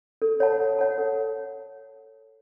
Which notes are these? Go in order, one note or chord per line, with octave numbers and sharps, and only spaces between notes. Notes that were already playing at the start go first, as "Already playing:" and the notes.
A4
C#5 F#5 A5
A4
C#5 F#5 A5
A4